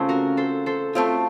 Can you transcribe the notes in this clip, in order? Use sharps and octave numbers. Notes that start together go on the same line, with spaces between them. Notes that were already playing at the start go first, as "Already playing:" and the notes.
Already playing: C#3 A3 C4 C#4 F4
F#4 A#4
A4 C5
A4 C5
A3 C4 F4